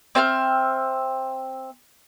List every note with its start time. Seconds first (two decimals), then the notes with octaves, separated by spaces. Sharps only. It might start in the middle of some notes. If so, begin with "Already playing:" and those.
0.15 C4 E5 A5 F6